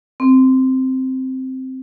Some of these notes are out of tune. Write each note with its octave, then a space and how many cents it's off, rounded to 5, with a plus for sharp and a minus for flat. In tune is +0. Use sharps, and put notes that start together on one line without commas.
C4 +0